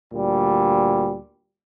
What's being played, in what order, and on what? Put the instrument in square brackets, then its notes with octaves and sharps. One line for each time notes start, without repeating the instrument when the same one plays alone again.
[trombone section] D2 A#2 G3